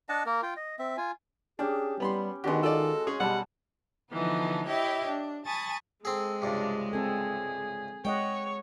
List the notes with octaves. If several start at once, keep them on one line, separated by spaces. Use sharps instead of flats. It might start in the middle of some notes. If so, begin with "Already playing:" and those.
D4 D#5 F#5 A5
A#3 A#4
F4 G5
D#5
C4 E5
F4 G#5
C#4 D4 G4 G#4
G3 B3 B5 C6
D#3 G#3 B3 D4 F#4 G4
F4 A4 D5
C#4 G#4 C#5
B2 G3 G4 F#5 A5 E6
D3 E3 F3 B3 D#4 A4
E4 G4 C#5 D#5 E5 G5
D4
G#5 A5 B5 C#6 D#6 A6
G#3 C4 G#4 A4
C#2 G2 C3 D4
C4 G#4 A4
G#3 C#5 D#5 F#5 G5